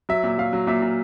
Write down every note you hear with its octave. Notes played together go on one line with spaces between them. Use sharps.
F#3 E5
A#2
F#3 F5
F#3
A#2 E5
A#2